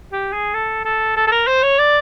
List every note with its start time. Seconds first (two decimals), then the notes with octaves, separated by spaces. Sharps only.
0.12 G4
0.33 G#4
0.54 A4
0.85 A4
1.16 A4
1.27 A4
1.32 A#4
1.47 C5
1.62 C#5
1.79 D5